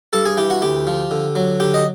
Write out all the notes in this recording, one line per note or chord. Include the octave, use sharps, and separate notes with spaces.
G2 A4 A5
G#4 G#5
E3 G4 G5
F#4 F#5
D2 G4 G5
F3
D3
F#3
D3 G4 G5
D#5